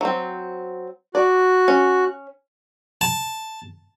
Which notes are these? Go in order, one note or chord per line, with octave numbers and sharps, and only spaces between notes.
F#3 C4
F#4 D5 F#6
C#4
A5